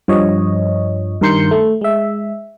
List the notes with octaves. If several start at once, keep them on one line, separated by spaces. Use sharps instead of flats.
G2 F3 C#5 D#5
G2 D#3 A#4 C6 G6 C#7
A3
G#3 E5